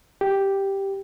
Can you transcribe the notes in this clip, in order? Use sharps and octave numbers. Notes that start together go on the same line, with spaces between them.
G4